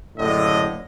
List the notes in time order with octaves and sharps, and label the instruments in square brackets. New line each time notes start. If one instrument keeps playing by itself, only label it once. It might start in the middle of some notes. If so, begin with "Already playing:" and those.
[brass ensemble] F#1 A2 D3 D#5